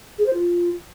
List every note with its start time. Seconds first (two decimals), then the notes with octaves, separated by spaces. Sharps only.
0.19 G#4
0.26 C5
0.34 F4